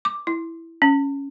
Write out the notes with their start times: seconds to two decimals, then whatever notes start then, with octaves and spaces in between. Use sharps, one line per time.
0.05 D6
0.27 E4
0.82 C#4